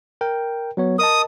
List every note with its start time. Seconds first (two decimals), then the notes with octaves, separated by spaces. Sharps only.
0.21 A#4 G5
0.77 F#3 B3 C#5
0.99 A#4 D#5 A5 D#6